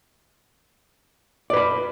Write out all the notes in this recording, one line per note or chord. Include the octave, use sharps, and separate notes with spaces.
B4 D5 B5